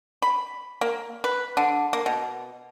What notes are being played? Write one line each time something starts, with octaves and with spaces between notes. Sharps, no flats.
B5
A#3
B4
D3
A#3
B2